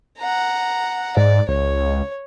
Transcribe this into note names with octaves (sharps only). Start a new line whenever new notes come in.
F#5 A#5
G#2 D5
C#2 C#5